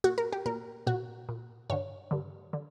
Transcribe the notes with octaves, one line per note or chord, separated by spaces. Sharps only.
A#2 F#4
A#4
G4
A#2 A#4
A#2 F#4
A#2
G2 D3 C#5
G2 D3
D3